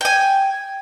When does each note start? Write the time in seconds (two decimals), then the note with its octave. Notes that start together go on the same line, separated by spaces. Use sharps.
0.01 G5 G#5